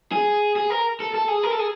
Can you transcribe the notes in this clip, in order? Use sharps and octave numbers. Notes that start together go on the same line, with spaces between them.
G#4
G#4
A#4
A4
A4
G#4
A#4
A4
G#4